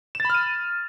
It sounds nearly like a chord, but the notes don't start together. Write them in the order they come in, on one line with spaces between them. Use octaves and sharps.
E7 A6 B5 F6 D#7